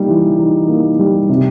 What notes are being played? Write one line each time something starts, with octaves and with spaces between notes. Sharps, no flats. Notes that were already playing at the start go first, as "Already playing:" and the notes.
Already playing: G3 A#3 D#4
E3
D#4
A#3
G3
C3